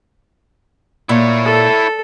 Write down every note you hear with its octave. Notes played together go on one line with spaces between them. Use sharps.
A#2 E4 C#5
A4